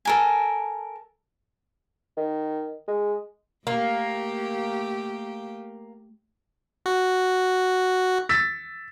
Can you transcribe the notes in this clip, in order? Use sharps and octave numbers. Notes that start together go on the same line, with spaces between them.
A4 A#4 G#5
D#3
G#3
A3 A#3 G4
F#4
E6 A6 B6